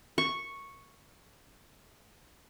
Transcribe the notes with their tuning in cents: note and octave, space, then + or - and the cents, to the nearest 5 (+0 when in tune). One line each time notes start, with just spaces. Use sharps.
C#6 -5